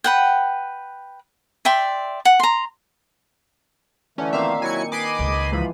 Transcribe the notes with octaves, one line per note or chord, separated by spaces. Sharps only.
B4 F#5 G5
D5 E5 G5 C6
F#5
A#5 C6
D3 E3 A3 C#4
A#2 D#3 C4 E5 F5
F#3 E4 F#4 G#5 C#7
B4 D#5 G#5 B5 D6 C7 D#7
C#2
G#2 E3 F3 B5